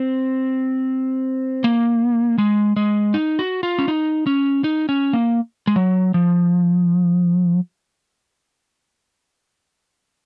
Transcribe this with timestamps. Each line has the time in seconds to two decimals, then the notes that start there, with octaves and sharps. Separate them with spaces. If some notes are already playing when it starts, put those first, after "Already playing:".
Already playing: C4
1.64 A#3
2.38 G#3
2.76 G#3
3.14 D#4
3.39 F#4
3.63 F4
3.79 C#4
3.88 D#4
4.27 C#4
4.64 D#4
4.89 C#4
5.13 A#3
5.67 G#3
5.76 F#3
6.14 F3